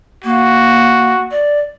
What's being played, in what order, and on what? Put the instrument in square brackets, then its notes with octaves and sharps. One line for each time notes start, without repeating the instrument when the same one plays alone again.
[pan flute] A#3 [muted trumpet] F#4
[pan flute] D5